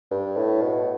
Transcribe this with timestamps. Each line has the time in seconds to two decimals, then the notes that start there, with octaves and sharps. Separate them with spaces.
0.11 G2
0.37 A2
0.62 B2